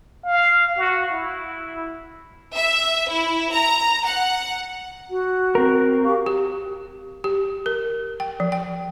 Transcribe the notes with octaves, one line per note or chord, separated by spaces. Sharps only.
F5
F#4
E4
E5
E4
A#5
F#5
F#4
C4 A#4
G4 F5 C#6
G4
G4
A#4
G5
F3
G5